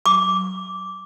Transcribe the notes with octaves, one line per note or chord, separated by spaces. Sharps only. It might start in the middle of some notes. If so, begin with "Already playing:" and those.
D6